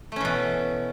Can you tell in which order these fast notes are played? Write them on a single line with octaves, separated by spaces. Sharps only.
A3 C#4 E3 B2